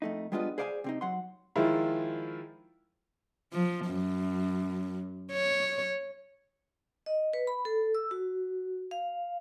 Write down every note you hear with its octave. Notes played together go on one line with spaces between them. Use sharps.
F2 A3 D#4
G3 G#3 B3 D4 F4 D#5
G#4 C5 D5 F5 F#5 G#5
C3 C4 D#4
F#3 F#5 C6
D#3 F3 G#3 E4 F4
F3
F#2
C#5
D#5
B4
B5
A4
E6
F#4
F5